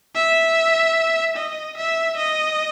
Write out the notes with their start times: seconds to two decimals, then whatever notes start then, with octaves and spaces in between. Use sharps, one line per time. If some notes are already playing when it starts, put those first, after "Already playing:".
0.16 E5
1.36 D#5
1.77 E5
2.18 D#5